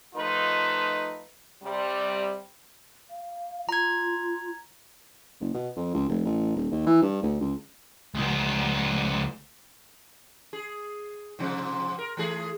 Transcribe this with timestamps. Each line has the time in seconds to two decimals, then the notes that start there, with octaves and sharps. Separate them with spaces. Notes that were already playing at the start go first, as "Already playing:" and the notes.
0.15 D#3 F3 A3 D#4 F4 B4
1.63 C3 G3
3.10 F5
3.69 F4 A#5 G#6
5.41 F#1
5.54 B2
5.77 F2
5.95 C#2
6.09 F1
6.25 A1
6.56 D#1
6.72 D#2
6.86 E3
7.02 G2
7.23 D2
7.41 C#2
8.15 C#2 B3
10.53 G#4
11.39 G#2 C3 F3
11.99 A#4
12.17 E3 A3 G#4